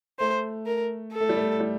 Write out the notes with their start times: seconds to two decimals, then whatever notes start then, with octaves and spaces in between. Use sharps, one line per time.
0.19 A3 C5
0.66 A#4
1.13 A4
1.20 A3
1.29 G3
1.37 A3
1.60 G3